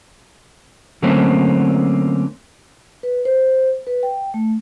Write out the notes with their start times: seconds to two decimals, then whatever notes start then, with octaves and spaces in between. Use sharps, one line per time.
1.02 D3 F#3 A3 A#3 C4 C#4
3.03 B4
3.25 C5
3.87 B4
4.03 G5
4.34 A3